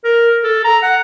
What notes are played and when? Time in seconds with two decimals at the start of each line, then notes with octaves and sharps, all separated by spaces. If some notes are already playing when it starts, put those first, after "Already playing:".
0.04 A#4
0.44 A4
0.64 A#5
0.82 F#5